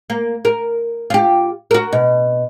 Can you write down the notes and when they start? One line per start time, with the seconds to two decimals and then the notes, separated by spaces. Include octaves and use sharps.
0.10 A#3
0.45 A#4
1.10 F4 G4
1.71 F#4 A#4
1.93 B2